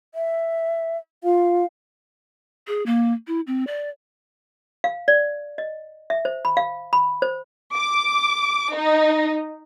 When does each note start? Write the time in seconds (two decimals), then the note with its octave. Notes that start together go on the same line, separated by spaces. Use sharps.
0.15 E5
1.24 F4 F5
2.67 G#4
2.86 A#3
3.27 E4
3.47 C4
3.67 D5
4.84 F5
5.08 D5
5.58 D#5
6.10 E5
6.25 C5
6.45 B5
6.57 F5
6.93 B5
7.22 C5
7.75 D6
8.74 D#4